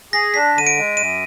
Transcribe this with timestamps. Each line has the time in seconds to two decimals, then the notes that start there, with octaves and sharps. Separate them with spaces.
0.13 G#4 A#6
0.34 D4 B6
0.55 D3 D#7
0.67 D7
0.77 G#3
0.97 F#2 D#7